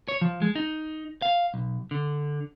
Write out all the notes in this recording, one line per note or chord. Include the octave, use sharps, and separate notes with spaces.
C#5
F3
G#3
D#4
F5
B1
D3